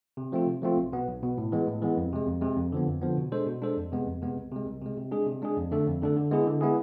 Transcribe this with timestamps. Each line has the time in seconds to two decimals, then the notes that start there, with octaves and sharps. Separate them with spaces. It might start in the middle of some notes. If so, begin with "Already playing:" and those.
0.17 C3
0.32 F3 A3 C4 F4
0.47 C3
0.62 F3 A3 C4 F4
0.77 B1
0.92 B2 B3
1.07 B1
1.22 B2 B3
1.38 A2
1.52 E3 G#3 B3
1.67 A2
1.82 E3 G#3 B3
1.97 F2
2.12 C3 G#3
2.27 F2
2.41 C3 G#3
2.57 F2
2.72 D3 F3 B3
2.87 F2
3.01 D3 F3 B3
3.17 B2
3.32 G#3 D4 A4 C5
3.47 B2
3.62 G#3 D4 A4 C5
3.76 F2
3.92 C3 G#3 B3
4.07 F2
4.22 C3 G#3 B3
4.37 C2
4.51 C3 G#3
4.67 C2
4.81 C3 G#3
4.97 C3
5.12 G#3 D4 G#4
5.26 C3
5.42 G#3 D4 G#4
5.57 F2
5.71 D3 A3 D4 A4
5.86 F2
6.02 D3 A3 D4 A4
6.16 D3
6.31 G#3 B3 E4 G#4
6.47 D3
6.61 G#3 B3 E4 G#4